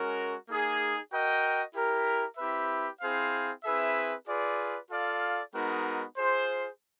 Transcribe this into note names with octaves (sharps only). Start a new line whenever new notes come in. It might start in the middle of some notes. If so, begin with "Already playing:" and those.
Already playing: G#3 C#4 F#4 A#4
A#3 D#4 G#4
F#4 A#4 D#5 G5
E4 G4 A#4
C4 E4 G4 B4 E5
C4 E4 G#4 C5 F5
C4 E4 G#4 B4 E5
F4 G#4 B4 D5
F4 A4 D5 F5
G#3 B3 D#4 F#4 A#4
F4 G#4 C5